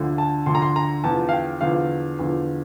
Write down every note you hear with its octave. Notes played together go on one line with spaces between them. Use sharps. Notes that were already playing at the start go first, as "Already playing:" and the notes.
Already playing: D2 D3 F3
A5
D2 D3 F3 C6
A#5
C6
A#5
E2 D3 F3 A5
F5
G5
E2 D3 F3 F5
E2 D3 F3